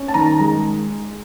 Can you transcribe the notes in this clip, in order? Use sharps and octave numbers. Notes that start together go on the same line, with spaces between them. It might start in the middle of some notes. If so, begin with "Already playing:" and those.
Already playing: C#4
A5
D#3 A#5
G#3